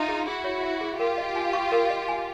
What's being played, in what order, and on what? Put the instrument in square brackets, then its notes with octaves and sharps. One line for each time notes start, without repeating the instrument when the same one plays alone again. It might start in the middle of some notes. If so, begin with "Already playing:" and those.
Already playing: [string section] D#4 F4 [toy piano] E5
[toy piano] G#4
[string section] E4 F#4 [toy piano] G#4
[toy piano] C#5
E5
G#4
[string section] F4 G4 [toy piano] A#4
[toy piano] D#5
G#5
C#6
A#4
D#5
G#5